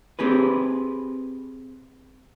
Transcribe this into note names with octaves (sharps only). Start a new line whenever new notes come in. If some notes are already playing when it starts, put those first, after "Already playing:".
C4 G4 G#4 B4